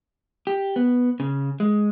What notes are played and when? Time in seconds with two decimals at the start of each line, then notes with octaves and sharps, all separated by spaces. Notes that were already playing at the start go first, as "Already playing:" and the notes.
0.47 G4
0.76 B3
1.20 C#3
1.60 G#3